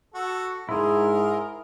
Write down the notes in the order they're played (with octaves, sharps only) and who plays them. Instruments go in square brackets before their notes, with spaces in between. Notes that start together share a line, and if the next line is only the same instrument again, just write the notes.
[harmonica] F#4 A4
[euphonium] G#2 [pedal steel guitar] E4 G#4 [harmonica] A#4 C6